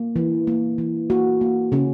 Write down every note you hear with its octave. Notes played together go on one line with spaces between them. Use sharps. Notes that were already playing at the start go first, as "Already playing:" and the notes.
Already playing: A#3
E3
A#3
E3
A#3 F#4
A#3
C#3 C#4